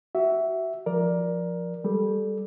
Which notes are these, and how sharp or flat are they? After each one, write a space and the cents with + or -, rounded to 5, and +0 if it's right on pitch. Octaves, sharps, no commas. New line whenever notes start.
F#4 +25 E5 +0
F3 +0 A#4 +15 D5 +0
G3 +0 A4 -20